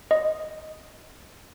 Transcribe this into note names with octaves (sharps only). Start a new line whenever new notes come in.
D#5